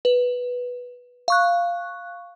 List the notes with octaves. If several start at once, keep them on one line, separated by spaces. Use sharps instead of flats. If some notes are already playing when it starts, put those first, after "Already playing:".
B4
F5 C#6 F#6